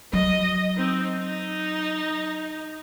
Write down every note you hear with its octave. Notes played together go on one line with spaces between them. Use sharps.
F#3 D#5
C4 D#4
D#4